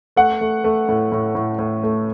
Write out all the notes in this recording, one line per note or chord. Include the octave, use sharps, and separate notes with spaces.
A3 F#5
A3
A3
A2
A2
A2
A2
A3